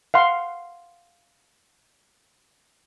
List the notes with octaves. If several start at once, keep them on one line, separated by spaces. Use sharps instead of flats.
F5 F#5 C6